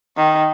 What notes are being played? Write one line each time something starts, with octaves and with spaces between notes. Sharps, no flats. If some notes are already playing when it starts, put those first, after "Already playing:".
D#3